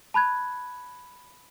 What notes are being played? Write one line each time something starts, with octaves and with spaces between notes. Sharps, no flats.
A5 B5 F#6 G#6